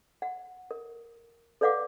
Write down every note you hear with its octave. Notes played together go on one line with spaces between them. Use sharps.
F#5
A#4
A4 B4 D5 F5 F#5 D6